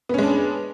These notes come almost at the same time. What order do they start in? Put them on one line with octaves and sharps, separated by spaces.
B3 C#4 G#3 D4